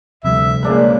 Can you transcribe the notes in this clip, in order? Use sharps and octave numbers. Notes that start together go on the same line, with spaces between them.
D2 C3 F3 G3 E5
A#2 C#3 G#3 A#3 D4 B4